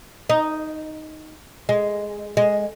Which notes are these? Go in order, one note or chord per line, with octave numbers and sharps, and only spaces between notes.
D#4
G#3
G#3